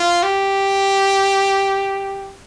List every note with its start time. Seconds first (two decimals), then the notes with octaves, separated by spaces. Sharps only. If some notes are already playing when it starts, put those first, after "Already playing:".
Already playing: F4
0.23 G4